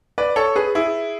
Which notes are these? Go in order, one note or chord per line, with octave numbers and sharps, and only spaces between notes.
B4 D5
A4 C#5
G#4 B4
E4 G#4